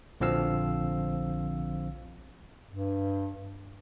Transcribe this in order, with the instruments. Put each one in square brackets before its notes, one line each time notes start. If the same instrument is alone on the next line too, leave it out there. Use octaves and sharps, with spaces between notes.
[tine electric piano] A#1 D3 F3 C4 F5 E6
[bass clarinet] G2